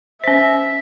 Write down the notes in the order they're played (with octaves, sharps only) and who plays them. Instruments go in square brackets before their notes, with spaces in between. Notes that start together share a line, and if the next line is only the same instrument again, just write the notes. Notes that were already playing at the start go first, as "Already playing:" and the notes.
[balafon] C#4 C5 [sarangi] E5 [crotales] B6